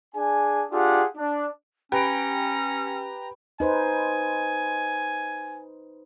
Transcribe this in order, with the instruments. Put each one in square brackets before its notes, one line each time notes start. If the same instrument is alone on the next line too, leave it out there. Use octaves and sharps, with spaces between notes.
[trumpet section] D4 G#4 G#5
D4 F4 G4 G#4 F#5
D4
[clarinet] C#4 [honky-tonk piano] G4 D7 [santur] B4 G5 [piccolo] A#5
[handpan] D#4 B4 C5 [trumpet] G#5